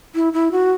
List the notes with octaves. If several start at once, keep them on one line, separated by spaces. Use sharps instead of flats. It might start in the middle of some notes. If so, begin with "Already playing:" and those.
E4
E4
F#4